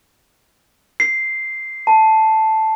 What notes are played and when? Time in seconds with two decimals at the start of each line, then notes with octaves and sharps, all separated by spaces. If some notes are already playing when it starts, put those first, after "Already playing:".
1.00 C7
1.87 A5